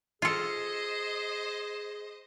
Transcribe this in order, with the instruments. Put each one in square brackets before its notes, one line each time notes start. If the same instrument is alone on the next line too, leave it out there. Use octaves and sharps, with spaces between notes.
[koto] F4 A4 [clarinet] G#4 [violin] C5 D#5